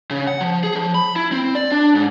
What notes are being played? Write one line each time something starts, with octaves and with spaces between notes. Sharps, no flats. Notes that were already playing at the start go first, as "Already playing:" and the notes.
C#3
F#5
F3
G#4
F3
B5
E4
C4
D5
D4
G#2